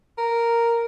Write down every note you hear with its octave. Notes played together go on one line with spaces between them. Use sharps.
A#4